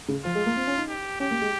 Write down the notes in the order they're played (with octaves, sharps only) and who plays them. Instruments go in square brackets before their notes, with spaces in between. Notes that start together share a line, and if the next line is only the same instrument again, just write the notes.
[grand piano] C#3
[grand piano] F3 [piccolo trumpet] F4
[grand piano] G#3
A#3
C4
C#4
D#4
[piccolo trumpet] G4
[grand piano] C#4 [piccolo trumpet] G4
[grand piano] A#3
G#3